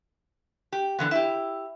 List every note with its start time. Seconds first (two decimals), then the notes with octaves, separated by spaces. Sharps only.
0.72 G4
0.99 D3 E3 B3
1.11 E4 G4 E5